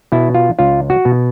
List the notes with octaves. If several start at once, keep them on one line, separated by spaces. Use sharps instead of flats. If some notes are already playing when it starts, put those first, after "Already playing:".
B2 E4
F4
C#2 F4
F#4
B2